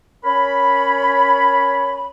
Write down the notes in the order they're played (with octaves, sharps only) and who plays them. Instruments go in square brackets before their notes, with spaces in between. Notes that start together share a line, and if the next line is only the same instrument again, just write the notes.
[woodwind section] C#4 A#4 C#5 B5